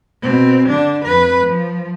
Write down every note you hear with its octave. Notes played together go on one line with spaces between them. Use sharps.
B2 C4
D3 D4
F2 B4
F3